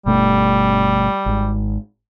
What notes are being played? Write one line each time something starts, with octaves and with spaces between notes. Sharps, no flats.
G1 B2 G3 A3
G#1 G#2